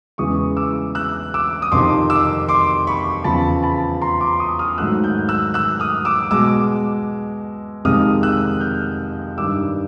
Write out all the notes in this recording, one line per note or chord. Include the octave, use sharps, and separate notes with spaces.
E2 C#3 E3 G#3 C#6 D#6
D6 E6
E6 F#6
D6 E6
D#6
F2 C3 D#3 C6 D6
D6 E6
C6 D6
B5 C#6
E2 C#3 F3 A5 B5
A5 B5
A#5 C6
C6 D6
C#6 D#6
D#6 F6
G#2 D#3 F#3 A3 E6 F#6
F6 G6
E6 F#6
E6 F#6
D#6 F6
D6 E6
B2 G#3 D6 E6
F2 C3 D#3 G#3 D#6 F6
E6 F#6
F6 G6
G2 D#3 G3 D6 E6